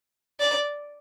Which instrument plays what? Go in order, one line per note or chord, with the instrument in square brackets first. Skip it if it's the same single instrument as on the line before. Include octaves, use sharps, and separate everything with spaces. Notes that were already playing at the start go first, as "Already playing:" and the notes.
[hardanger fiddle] D5